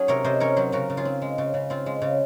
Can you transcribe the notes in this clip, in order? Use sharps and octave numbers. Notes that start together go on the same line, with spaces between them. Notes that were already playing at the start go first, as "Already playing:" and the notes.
Already playing: F#3 C#4 G#4
C3 A#4 C#5
C3 C5 D#5
C#4 A#4 C#5
F#3 G#4 C5
C#3 F#4 A#4
C#3
F4 G#4
C4
G#3
C#3
C#3
C4 F4
G#3
C#3